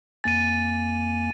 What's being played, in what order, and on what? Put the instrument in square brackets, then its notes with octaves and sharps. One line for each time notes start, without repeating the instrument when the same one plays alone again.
[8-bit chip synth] F2 A#3 G#5 [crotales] A6 D#7